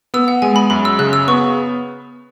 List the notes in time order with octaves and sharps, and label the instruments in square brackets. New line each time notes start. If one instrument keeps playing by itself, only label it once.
[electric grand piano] B3 [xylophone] E6
[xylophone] F#5
[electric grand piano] G#3 [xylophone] G#5
[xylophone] B5
[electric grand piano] F#2 [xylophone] B5
[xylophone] E6
[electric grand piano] C#3 [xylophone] F#6
[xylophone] E6
[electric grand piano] B3 [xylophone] C#6